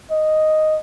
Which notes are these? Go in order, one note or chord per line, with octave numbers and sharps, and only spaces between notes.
D#5